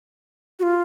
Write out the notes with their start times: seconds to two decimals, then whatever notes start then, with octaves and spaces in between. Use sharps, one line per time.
0.59 F#4
0.63 F4